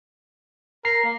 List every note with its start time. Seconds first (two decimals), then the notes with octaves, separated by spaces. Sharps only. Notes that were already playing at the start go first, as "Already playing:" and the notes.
0.85 A#4 A#5 C7
1.04 A#3